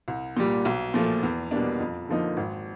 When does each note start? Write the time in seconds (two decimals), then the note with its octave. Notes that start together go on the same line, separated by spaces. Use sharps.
0.08 C2
0.37 A#2 G3
0.65 B1
0.94 A#2 F3 A3
1.23 E2
1.51 B2 G3 A#3 D4
1.80 F2
2.09 D3 F3 A#3 D#4
2.37 G#1